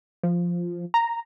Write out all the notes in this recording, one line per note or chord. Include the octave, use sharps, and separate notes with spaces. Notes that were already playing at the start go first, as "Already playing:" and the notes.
F3
A#5